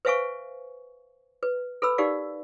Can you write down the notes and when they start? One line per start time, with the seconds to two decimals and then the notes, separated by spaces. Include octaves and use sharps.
0.05 B4 C5 E5 F5 G#5 C#6
1.43 B4
1.82 A4 B4 B5 E6
1.98 D#4 G4 A#4 D5 F5